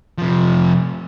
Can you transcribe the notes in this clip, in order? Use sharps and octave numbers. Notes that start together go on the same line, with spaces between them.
C3 F3